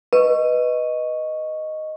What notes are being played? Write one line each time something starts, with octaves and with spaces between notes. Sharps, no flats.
B4 D#5 C#6